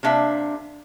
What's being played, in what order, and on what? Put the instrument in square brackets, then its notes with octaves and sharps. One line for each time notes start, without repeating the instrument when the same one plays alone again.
[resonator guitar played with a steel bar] C3 A#3 D4 E5